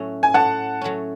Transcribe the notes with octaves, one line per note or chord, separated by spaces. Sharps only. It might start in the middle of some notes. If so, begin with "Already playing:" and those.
Already playing: A2 F#3 A3 C#4
G#5
A2 F#5 A5
F#3 A3 C#4